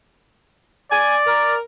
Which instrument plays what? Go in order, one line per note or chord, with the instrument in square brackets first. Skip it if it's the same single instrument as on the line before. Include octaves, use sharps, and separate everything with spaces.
[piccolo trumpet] D5 [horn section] G#5
[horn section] A#4